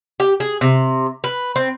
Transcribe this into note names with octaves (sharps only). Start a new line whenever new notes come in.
G4
G#4
C3
B4
C4